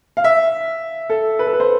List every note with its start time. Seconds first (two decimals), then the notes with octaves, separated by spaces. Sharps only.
0.17 F5
0.24 E5
1.10 A4
1.39 B4
1.47 A4
1.53 B4
1.60 C5